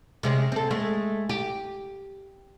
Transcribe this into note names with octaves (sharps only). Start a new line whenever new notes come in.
C3 G#3 C#4
C4 A4
G#3 A3
G4